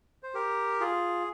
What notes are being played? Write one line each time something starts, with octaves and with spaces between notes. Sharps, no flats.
C5
G4 A#4
F4 G#4